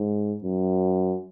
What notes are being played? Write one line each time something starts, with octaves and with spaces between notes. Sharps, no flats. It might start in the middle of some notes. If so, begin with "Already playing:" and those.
Already playing: G#2
F#2